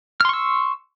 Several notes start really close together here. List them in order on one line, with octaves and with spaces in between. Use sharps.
F6 C6 C#6 E6